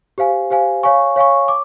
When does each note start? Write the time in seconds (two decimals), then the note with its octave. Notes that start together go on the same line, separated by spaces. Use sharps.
0.18 G4 C5 F5 G#5
0.50 G4 C5 F5 G#5
0.83 C#5 F5 G#5 C#6
1.16 C#5 F5 G#5 C#6
1.48 D6